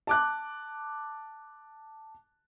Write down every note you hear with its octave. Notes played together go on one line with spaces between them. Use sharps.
A5 D6 F#6